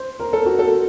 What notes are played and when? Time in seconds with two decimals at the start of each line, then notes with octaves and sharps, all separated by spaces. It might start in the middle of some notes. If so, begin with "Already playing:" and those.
Already playing: C5
0.20 A#4
0.33 A4
0.46 F#4
0.59 A4